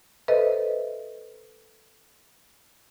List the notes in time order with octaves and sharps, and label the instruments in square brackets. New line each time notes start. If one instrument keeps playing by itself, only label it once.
[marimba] A4 B4 C5 D#5 E5